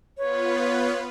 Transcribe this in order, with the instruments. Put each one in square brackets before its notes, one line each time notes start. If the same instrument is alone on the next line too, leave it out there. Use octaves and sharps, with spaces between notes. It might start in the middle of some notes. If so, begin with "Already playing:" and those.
[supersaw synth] B3 F4 B4 [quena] C#5